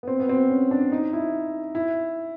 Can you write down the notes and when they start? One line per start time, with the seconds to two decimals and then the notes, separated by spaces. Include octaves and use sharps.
0.03 B3
0.07 C4
0.20 B3
0.29 C4
0.50 C#4
0.71 D4
0.92 D#4
1.13 E4
1.75 E4